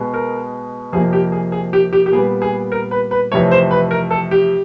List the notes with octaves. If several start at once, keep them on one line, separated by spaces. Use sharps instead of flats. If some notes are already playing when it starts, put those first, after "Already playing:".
Already playing: B2 G#3 B3
A#4
F2 C3 F3 A#3 G#4
G4
G#4
G#4
G4
G4
G4
A#2 G3 B3 G#4
G#4
A#4
B4
B4
F2 C3 E3 A3 C#5
C5
B4
A#4
A4
G4